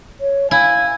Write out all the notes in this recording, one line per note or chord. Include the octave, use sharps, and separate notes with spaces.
C#5
E4 F5 G#5